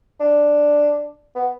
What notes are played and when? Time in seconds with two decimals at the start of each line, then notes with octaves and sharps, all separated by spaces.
0.20 D4
1.35 B3